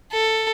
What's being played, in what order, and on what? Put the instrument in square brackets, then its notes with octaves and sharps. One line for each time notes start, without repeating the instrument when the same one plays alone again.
[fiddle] A4